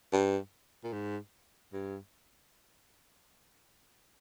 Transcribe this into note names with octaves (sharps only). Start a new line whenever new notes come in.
G2
A#2
G#2
G2